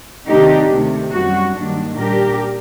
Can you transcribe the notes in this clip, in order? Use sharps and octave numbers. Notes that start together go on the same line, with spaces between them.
C3 D#3 A3 D4 D#4 G4
D2 C3 D#3 A3
F#2 D#3 G3 F#4
G2 D#3 F#3 A#3 D4
A#2 G3 D4 G4 A#4